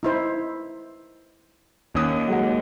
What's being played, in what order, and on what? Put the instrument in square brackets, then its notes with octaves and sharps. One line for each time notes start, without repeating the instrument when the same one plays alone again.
[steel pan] D#4 E4 C5
[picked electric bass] D#2 [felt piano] C#4 D#6
[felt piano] F#3 G#3 F#5